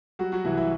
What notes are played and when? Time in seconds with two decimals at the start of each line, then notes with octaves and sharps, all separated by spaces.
0.19 F#3 G3 F#4
0.32 F#3 F#4
0.45 C2 E3 E4
0.57 E3 E4